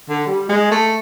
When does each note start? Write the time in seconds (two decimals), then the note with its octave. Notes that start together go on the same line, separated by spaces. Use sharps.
0.10 D3
0.27 G3
0.49 G#3
0.72 A3